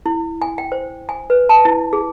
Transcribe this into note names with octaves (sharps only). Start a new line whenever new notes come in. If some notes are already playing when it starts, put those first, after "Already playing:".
E4
G#5
G5
C5
G#5
B4
A5
E4
G#4